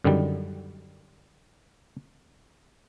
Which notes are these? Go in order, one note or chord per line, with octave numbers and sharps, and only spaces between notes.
F#2 D3 D#3 G3